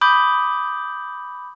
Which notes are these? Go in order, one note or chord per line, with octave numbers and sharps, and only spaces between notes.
B5 D6 D#6 G6